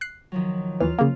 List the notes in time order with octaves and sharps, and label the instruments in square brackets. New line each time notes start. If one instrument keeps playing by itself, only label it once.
[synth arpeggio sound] F#6 C7
[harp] D#3 F3 F#3
[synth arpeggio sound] D#2 E3 [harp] F4 F6
[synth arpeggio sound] C#3 A#3